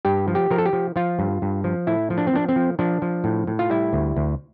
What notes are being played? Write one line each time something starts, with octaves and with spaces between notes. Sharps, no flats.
G2 G4
F3
G4
F3 A#4
A4
G4
F3
F3 F4
G2
G2
F3
A2 E4
F3
D4
C4
F3 D4
C4
F3
F3 D4
F3
A2
A2
F4
G3 E4
D2
D2